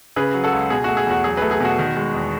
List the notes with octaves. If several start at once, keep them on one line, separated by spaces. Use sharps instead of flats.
C#3 G#4 B4
F#3
F#4 A4
C#2
B2 G#4
A3 F#4
G#4
E2 F#4
F#3 G#4
A3 G#4 B4
G#4
B2 F#4
D#3
G#3
E2